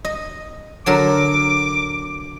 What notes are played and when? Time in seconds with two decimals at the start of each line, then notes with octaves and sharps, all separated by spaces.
0.05 D#5
0.86 D3 F#3 A#4 D6